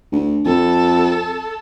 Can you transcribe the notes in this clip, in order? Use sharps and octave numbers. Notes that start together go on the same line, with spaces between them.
D2
F2 A4